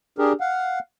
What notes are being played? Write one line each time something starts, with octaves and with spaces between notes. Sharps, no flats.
D4 G4 G#4 A#4
F5 F#5